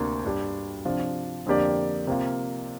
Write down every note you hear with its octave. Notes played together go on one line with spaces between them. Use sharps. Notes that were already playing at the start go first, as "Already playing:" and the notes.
Already playing: D2 C3 A#3 D4 A#4
G2 G3 D4 G4
C3 F3 D4 F4
F2 D3 A#3 G4 D5
C3 A#3 F4